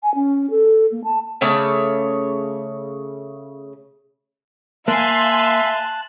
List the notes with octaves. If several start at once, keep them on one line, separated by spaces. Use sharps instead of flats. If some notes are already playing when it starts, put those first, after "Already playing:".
G#5
C#4
A4
A#3
A5
C#3 A3 C#5 D5
A#3 E5 F5 G#5 A5 C6 F#6